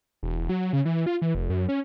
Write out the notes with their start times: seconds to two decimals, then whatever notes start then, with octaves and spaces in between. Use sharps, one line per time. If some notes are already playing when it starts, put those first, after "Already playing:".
0.23 E1
0.49 F#3
0.73 C#3
0.85 E3
1.06 F4
1.22 E3
1.35 F1
1.50 F#2
1.69 C#4